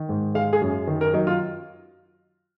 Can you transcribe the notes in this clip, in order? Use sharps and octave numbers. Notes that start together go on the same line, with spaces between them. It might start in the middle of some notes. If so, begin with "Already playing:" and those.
Already playing: D#3
G#2
G#3 F5
G#4
F#2
D#3
A#4
F#3 D#4
F4